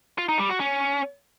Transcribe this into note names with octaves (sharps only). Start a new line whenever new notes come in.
F4
D#4
G3
F#4
C#4